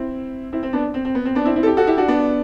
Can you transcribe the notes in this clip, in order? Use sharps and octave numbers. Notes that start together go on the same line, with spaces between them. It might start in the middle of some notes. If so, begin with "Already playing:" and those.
Already playing: C4 E4
C4 E4
C4
B3 D4
C4
C4
B3
C4
B3 D4
C4 E4
C4 E4
A4
E4 G4
F#4 A4
E4 G4
D4 F#4
B3 D4